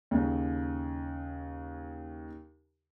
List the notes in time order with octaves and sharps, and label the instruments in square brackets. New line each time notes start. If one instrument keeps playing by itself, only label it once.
[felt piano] D#2 C#3